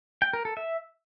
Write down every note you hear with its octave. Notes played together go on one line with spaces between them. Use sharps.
G5
A#4
A4
E5